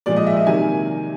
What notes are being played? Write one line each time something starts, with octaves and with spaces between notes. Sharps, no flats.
A#2 F3 G#3 D5
D#5
E5
D#5
C3 D#3 F#3 A#3 G#5